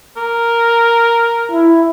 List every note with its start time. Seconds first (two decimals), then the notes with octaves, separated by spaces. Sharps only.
0.17 A#4
1.51 E4